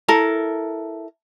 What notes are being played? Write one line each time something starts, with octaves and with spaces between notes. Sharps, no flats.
E4 A4 A#4